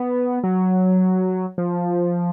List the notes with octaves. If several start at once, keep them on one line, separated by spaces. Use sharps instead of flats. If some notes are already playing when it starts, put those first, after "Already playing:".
Already playing: B3
F#3
F3